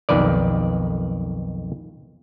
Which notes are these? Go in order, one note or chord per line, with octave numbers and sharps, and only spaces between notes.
B1 F2 D#3 B4 D5